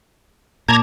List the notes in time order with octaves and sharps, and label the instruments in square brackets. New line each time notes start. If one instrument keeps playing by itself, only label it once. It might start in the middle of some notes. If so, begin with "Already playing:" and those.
[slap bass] A#2 [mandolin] A5 D6 [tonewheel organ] A#5 G#6